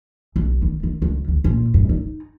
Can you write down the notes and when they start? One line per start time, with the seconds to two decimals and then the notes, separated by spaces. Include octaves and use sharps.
0.36 B1
0.62 D#3
0.83 D#3
1.02 C#2
1.28 D2
1.44 A#2
1.74 G2
1.89 D#4